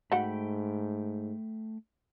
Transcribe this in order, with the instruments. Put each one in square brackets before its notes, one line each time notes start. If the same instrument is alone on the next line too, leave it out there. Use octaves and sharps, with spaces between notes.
[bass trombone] G#2 [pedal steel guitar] A3 G5 B5 [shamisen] F#4 D#5 F#5